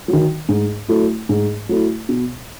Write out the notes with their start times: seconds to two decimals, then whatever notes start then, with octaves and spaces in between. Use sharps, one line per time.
0.08 D#3 F#3
0.49 G#2
0.88 F#3 A3 E4
1.29 G#2
1.69 F#3 A3 E4
2.09 B2